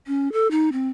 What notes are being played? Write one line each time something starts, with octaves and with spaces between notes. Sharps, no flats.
C#4
A4
D#4
C4